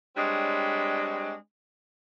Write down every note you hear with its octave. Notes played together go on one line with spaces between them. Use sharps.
G3 G#3 C4 D4 C#5